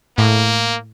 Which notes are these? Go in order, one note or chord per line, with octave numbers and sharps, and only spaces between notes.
A2 A#3